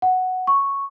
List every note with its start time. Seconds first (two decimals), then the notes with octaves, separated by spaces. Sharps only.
0.02 F#5
0.47 C#6